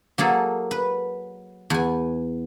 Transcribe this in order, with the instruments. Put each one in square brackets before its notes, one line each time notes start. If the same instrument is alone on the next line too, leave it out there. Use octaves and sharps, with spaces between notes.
[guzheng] F#3 A#3 G#4 A4
B4
E2 G#5